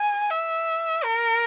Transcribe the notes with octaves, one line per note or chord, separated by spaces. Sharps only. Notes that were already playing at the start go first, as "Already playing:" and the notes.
Already playing: G#5
E5
A#4